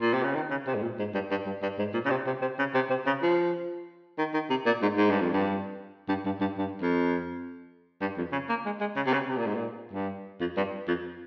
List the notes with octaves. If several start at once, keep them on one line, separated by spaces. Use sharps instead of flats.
A#2
C3
C#3
D#3
C#3
C3
G#2
A#2
G#2
G2
G2
G2
G2
G#2
A#2
C#3
C3
C3
C3
C#3
C3
C3
C#3
F3
D#3
D#3
C3
A#2
G#2
G#2
G2
F2
G2
G2
G2
G2
G2
F2
G2
F2
C#3
A#3
G#3
G#3
C#3
C3
C#3
C3
A#2
G#2
A#2
G2
F2
G2
F2